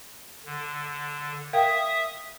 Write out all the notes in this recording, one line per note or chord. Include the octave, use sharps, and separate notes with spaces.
D3
A#4 E5 F5 G5 D#6